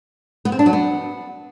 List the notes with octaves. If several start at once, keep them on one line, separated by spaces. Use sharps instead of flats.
B3
C4
D4
F#3
B3